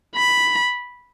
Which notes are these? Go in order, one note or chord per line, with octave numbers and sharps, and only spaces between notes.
B5